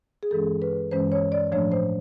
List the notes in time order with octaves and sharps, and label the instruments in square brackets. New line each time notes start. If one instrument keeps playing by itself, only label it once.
[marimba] G#4
G2 E3 G#3 C#4 A4
B4
G2 E3 G#3 C#4 C5
C#5
D5
A2 F3 A3 D4 C#5
C5